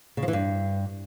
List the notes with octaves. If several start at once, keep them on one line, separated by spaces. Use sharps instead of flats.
C#3
F3
E3
G2